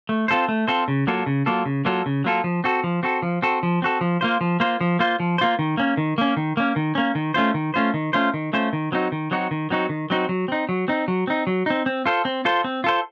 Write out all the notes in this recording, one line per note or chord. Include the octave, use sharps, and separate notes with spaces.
A3
C4 F4 A4 C5
A3
C4 F4 A4 C5
C#3
F#3 A#3 F4 A4
C#3
F#3 A#3 F4 A4
C#3
F#3 A#3 F4 A4
C#3
F#3 A#3 F4 A4
F3
C4 F#4 A4
F3
C4 F#4 A4
F3
C4 F#4 A4
F3
C4 F#4 A4
F3
A#3 F4 C5
F3
A#3 F4 C5
F3
A#3 F4 C5
F3
A#3 F4 C5
D#3
A#3 C#4
D#3
A#3 C#4
D#3
A#3 C#4
D#3
A#3 C#4
D#3
A3 C#4 F4 C5
D#3
A3 C#4 F4 C5
D#3
A3 C#4 F4 C5
D#3
A3 C#4 F4 C5
D#3
F#3 C4 D#4 F#4
D#3
F#3 C4 D#4 F#4
D#3
F#3 C4 D#4 F#4
D#3
F#3 C4 D#4 F#4
F#3
C4 D#4
F#3
C4 D#4
F#3
C4 D#4
F#3
C4 D#4
C4
F4 A4 C5
C4
F4 A4 C5
C4
F4 A4 C5